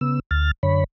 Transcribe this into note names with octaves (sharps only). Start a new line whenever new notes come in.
C#3 B3 E6
D2 F6 A6
F#2 D3 C#5 B5